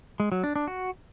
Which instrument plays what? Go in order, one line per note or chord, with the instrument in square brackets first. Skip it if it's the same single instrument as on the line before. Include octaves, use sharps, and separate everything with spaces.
[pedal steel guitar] G#3
F#3
D4
D4
F#4